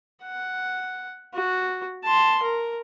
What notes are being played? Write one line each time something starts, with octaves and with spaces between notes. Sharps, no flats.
F#5
F#4
A5 C6
A#4